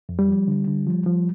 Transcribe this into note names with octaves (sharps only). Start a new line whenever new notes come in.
F2
G3
F3
D3
D3
F3
F3